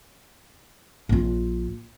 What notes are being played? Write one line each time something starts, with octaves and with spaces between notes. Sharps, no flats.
A#1 F4